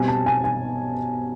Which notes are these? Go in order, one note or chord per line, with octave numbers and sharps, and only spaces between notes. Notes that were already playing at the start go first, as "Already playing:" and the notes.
Already playing: B2 G3 C4 G#5
A5
G#5
G#5